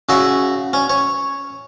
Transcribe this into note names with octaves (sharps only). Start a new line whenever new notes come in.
C#3 F#4 E5
C#4
C#5